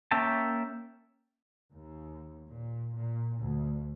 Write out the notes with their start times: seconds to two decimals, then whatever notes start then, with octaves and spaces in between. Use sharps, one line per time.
0.11 A#3 C#4 E5 G5 A5
1.72 D#2
2.52 A#2
2.97 A#2
3.43 D2